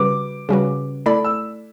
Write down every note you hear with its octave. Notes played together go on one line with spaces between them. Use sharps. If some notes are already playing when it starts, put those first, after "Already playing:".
Already playing: C#3 G3 C#4 F#4 B4 D6
C#3 G3 C#4 F#4 B4
A3 E4 A4 D5 B5
E6